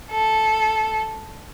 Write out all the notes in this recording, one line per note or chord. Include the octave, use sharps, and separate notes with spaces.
A4